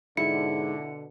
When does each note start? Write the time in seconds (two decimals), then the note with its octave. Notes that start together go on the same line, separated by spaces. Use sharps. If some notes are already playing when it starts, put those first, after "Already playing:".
0.17 G#2 B2 D3 E4 C#7